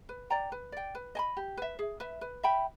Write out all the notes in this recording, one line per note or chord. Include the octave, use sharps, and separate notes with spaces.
B4
D5 G5 A#5
B4
D5 G5
B4
D#5 G#5 B5
G4
B4 E5
G#4
B4 E5
B4
E5 G5 B5